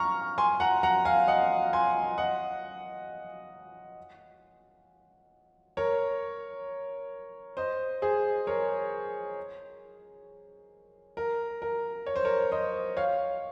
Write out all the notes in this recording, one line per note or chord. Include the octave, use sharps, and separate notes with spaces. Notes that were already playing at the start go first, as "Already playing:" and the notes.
Already playing: A#5 C#6 F6
G#5 C6
F#5 A#5
F#5 A#5
F5 G#5
D#5 F#5
G#5 C6
D#5 F#5
A#4 C#5
C5 D#5
G#4 C5
A#4 C#5
A#4
A#4
C#5
C5
A#4 C#5
C5 D#5
C#5 F5